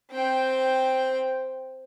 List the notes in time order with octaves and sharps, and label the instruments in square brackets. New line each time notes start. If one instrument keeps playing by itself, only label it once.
[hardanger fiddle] C4 G5